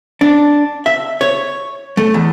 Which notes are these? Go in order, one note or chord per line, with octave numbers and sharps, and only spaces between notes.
D4
E5
C#5
A3
E2